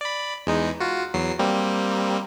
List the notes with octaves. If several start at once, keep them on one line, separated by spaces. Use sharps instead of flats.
D5 B5
E2 G#3 D#4
F4 F#4
E2 F#3 C7
G3 A#3 C4